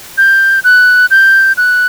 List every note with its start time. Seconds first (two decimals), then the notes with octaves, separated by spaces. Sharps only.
0.18 G6
0.64 F#6
1.11 G6
1.57 F#6